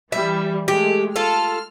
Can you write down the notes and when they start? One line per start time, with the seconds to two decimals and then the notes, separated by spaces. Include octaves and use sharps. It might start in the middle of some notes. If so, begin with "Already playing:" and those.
0.12 E3 G3 E5
0.68 G#3 A3 G4
1.16 F4 A4 F6